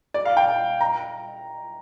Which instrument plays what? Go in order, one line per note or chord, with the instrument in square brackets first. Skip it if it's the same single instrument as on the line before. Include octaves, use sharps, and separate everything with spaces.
[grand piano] D5
F5
G5
A#5